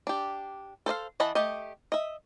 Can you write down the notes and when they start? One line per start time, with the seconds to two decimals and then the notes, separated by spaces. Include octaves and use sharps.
0.07 D4 G4
0.86 A4 C5 D#5 F5
1.20 E3 D#5 F#5 A5 B5
1.35 A3 G4 D#5
1.92 D#5 E5